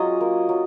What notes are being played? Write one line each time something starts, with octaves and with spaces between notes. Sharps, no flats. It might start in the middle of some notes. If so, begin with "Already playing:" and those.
Already playing: F#3 G#3 C#4 F4 D#5
A#3
F#3